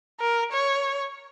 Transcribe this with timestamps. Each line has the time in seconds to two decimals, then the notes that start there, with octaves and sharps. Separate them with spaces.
0.20 A#4
0.52 C#5